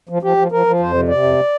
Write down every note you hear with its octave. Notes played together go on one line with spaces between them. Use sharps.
F3
F3 G4
F3
F3 A#4
F3
F2 C5
C3
C3 D5
F2